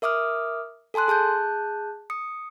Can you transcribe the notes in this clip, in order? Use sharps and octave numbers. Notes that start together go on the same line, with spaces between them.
A#4 E5 D6 D#6 F6
A4 G#5 A5 C6 F#6
G#4 A5 F#6 G6
D#6 C#7